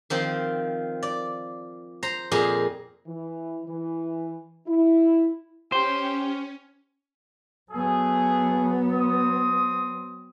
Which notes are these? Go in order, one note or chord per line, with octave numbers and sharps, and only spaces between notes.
D#3 F3 C4
D5
C5 A#5
F2 A#2 G#4 D#5 A#5
E3
E3
E4
C#4 G4 C5
F#3 A3 B3 G#4
C4 D#6